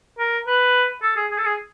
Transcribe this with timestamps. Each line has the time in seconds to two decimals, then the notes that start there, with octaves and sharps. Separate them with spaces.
0.19 A#4
0.47 B4
1.02 A4
1.17 G#4
1.31 G#4
1.38 A4
1.45 G#4